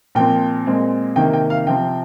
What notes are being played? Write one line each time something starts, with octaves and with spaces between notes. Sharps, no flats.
A#2 F3 C4 G5
A#2 G#3 C4
C3 D#3 A#3 G5
G5
F5
C3 F3 C4 G5